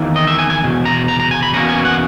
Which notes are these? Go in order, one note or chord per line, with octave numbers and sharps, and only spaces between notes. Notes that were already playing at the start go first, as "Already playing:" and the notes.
Already playing: E2 D#3 A#3 E4
D#5
E5
G#5
G#5
E2 B2
A#5
A#5
A#5
G#5
B5
E2 B2 A#3 C#4 A#5
G#5
F#5